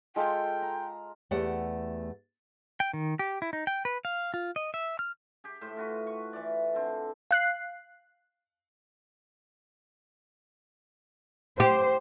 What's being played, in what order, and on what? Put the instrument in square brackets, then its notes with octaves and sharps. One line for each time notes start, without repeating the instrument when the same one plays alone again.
[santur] G#3 F4 A4 [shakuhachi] G5
[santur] A#5
[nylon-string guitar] E2 A3 G4 D5 F#5
[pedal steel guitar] G5
D#3
G4
E4
D#4
G5
B4
F5
F4
D#5
E5
F6
[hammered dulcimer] G4 G#4
A2 C5 E5
F4 F#4 B4
C#6
E3 D5
D3 C4
[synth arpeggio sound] F5 F#6 C7
[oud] G4 [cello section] C5